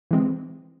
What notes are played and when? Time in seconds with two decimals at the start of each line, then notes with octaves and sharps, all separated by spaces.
0.11 E3 G#3 C4